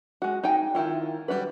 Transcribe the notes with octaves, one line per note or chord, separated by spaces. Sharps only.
G#3 F#4
D#4 G5 G#5
D#3 F3 E4 F4
G3 F4 F#4 B4